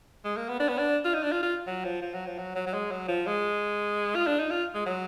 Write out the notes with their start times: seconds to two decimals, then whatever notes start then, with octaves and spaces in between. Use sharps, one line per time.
0.24 G#3
0.37 A#3
0.49 B3
0.60 D4
0.69 B3
0.78 D4
1.05 F4
1.14 D#4
1.23 D4
1.32 F4
1.43 F4
1.67 F#3
1.85 F3
2.02 F3
2.14 F#3
2.26 F3
2.38 F#3
2.55 F#3
2.67 F#3
2.74 G#3
2.91 F#3
3.08 F3
3.27 G#3
4.15 F4
4.27 D4
4.39 D#4
4.51 F4
4.75 G#3
4.86 F#3